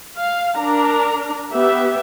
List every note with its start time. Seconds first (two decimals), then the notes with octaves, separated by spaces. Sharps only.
0.17 F5
0.58 D4 A#4 A#5
1.52 B3 G4 E5